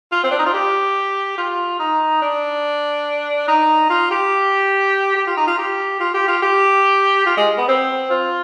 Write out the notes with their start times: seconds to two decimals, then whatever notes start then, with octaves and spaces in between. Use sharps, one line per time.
0.12 F4
0.23 C4
0.31 D4
0.38 D#4
0.46 F4
0.54 G4
1.38 F4
1.79 D#4
2.22 D4
3.48 D#4
3.90 F4
4.11 G4
5.16 G4
5.27 F4
5.37 D#4
5.47 F4
5.58 G4
6.00 F4
6.14 G4
6.28 F4
6.42 G4
7.26 F4
7.37 G#3
7.58 B3
7.68 C4
8.11 F4